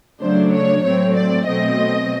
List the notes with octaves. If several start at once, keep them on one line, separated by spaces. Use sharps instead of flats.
C#3 F#3 A3 D4 C5
C#5
A2 F#3 A3 C4 C#5
D5
B2 F#3 A3 C4 D#5